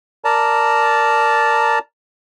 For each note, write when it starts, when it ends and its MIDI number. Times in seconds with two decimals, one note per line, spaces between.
0.25 1.79 70
0.25 1.79 74
0.25 1.79 81
0.25 1.79 82